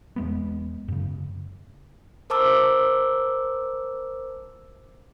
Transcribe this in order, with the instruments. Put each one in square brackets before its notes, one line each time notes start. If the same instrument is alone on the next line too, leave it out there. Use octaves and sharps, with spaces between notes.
[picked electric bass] E2 G#3 B3
F#2 C#3
[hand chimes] A#4 C5 A5 D6 E6